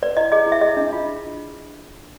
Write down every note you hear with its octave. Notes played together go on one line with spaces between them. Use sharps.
B4 D5
E4 D#5
G#4 D#5
E4
E5
G#4 D#5
D4
F4